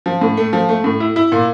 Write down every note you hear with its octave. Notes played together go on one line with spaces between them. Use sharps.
F3
A2
A3
F3
A3
A2
E4
E4
A#2